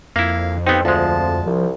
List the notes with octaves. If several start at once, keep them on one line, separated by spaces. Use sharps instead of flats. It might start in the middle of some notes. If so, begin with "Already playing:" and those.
F2 A#3 E4 F5
B3 C4 D#4 G4
D2 F3 G#3 A5
C2 F3